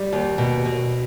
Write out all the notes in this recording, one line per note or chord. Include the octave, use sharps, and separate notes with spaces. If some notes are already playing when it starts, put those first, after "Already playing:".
Already playing: G3
D#2
B2
B2